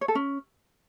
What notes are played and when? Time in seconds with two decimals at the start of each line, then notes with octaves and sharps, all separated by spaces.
0.01 C#5
0.08 A4
0.15 C#4